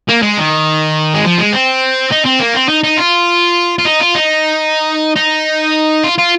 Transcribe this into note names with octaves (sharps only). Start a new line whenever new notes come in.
A#3
G#3
D#3
G#3
F3
G#3
C4
D#4
C4
A#3
C4
D#4
D#4
F4
F4
D#4
F4
D#4
D#4
F4
F4